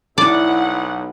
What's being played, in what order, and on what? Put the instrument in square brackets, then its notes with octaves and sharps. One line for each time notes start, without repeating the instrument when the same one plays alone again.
[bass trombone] B1 [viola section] E4 F#5 [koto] D5